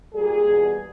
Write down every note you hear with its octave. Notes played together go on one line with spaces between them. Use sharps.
A#2 G3 G#4
E2 B2 G3